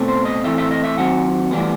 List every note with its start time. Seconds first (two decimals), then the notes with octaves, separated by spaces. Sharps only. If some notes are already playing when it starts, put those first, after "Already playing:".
Already playing: B2 A3 C4
0.08 C5
0.25 D#5
0.44 A2 E3 A3 C4 E5
0.58 E5
0.71 D#5
0.84 E5
0.98 D#3 F#3 C4 F#5
1.51 A2 E3 G3 B3